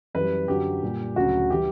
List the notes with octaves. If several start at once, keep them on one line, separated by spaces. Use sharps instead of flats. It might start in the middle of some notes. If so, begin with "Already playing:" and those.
F#2 E3 G3 B4
F#2 D3 F#3 G4
A#2 G3
D2 C#3 F#3 F#4
E3 G3 G4